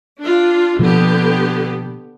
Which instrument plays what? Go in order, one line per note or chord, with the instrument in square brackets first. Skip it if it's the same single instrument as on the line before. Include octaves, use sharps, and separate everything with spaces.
[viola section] D4 F4
[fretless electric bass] B2 F3 A#3 [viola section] D3 B3 G4